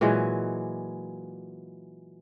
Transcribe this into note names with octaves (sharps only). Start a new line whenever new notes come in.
A#2 E3 F#3 G#3